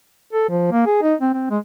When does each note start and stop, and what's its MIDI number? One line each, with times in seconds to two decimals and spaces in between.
0.33 0.46 69
0.49 0.71 53
0.72 0.85 58
0.86 0.98 68
1.02 1.15 63
1.21 1.32 60
1.33 1.46 60
1.50 1.58 56